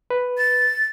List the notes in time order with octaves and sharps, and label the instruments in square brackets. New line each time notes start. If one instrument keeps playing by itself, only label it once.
[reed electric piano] B4
[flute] A6